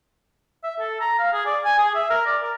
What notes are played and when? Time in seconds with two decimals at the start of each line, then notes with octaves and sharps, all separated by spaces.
0.64 E5
0.80 A4
1.01 A#5
1.19 F5
1.33 G#4
1.46 D5
1.65 G#5
1.79 G#4
1.95 E5
2.10 A#4
2.26 D5
2.43 A#4